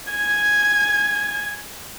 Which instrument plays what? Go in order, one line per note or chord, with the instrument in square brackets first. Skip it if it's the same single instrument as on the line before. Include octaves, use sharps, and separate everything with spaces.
[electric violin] G#5 G#6